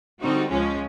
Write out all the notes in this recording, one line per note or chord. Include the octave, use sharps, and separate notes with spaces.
D3 G3 C4 D#4 F#4
C#2 C#3 F3 G#3 C#4